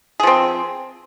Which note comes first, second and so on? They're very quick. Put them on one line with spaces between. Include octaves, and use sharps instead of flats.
G#4 F3 C4